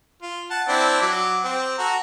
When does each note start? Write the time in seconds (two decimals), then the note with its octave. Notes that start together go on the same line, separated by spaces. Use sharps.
0.22 F4
0.51 F#5 A5
0.68 C4 D4 E4
1.02 F#3 D6
1.44 C4
1.78 F#4 A4 A#5